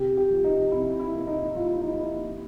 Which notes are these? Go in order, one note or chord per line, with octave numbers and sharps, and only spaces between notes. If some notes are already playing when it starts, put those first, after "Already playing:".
Already playing: C3 G4
G4
F3
D#4
C3 E4
E4
A#3
D#4
F3 F4
E4
D#4
A#3 E4